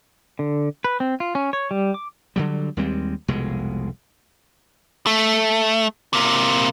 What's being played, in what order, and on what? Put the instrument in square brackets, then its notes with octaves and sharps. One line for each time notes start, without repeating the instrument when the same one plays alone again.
[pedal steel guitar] D3
B4
C4
F4
C#4
C#5
G3
D6
[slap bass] D3 F#3 G3
D#2 G3 G#3 C4
F1 C2 B2 G#3
[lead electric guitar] A3
C3 A#3